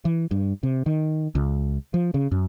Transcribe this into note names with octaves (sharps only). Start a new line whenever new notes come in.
E3
G2
C3
D#3
C#2
F3
C#3
F#2